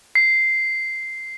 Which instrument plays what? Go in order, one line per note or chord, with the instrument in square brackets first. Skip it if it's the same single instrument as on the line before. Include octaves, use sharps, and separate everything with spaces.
[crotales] C7